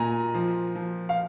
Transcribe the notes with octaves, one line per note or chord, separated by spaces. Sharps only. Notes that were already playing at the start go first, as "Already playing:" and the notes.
Already playing: A#2 G#5 A#5
F3
F3
F5